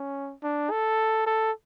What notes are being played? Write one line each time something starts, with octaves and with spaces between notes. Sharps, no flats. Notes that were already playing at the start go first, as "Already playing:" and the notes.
Already playing: C#4
D4
A4
A4